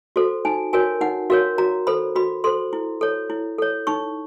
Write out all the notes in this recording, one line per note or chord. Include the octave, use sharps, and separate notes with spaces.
F#4 A4 C5
D#4 G#5
F#4 A#4 C#5 G#5
D#4 F#5
F#4 A#4 C#5 F5
F#4 A#5
A4 C5 B5
F#4 B5
A4 C5 C6
E4
A4 C#5
E4
A4 C#5
D#4 C#6